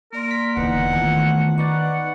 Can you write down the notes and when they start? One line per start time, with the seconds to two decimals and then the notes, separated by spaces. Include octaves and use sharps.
0.13 A#3 A#4 D5 C6
0.31 B6
0.57 D#1 D3 E3 B3 D#4 F#5
0.93 D#3 A3 F4
1.58 D#4 B4 D5 F#5 C#6 D6